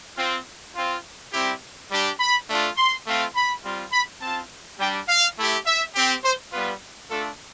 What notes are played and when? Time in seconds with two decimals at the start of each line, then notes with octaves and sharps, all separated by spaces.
0.17 C4 F4
0.76 C4 F4
1.33 G3 C4 E4 G4
1.90 G3 D4 G4
2.20 B5
2.49 A3 D4 F4
2.77 C6
3.07 A3 C4 F4
3.35 B5
3.64 G3 C4 F4
3.93 B5
4.21 C4 F4 A5
4.79 G3 D4 G4 G5
5.08 F5
5.38 A3 E4 G4
5.66 E5
5.95 C4 G4
6.24 C5
6.53 G3 B3 F4 B4
7.11 A3 D4 F4 A4